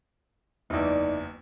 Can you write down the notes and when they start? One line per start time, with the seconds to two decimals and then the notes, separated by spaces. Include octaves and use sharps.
0.70 F#1 E2 D#4 E4 D5